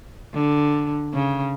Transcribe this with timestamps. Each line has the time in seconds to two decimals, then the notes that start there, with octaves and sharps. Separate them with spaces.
0.33 D3
1.13 C#3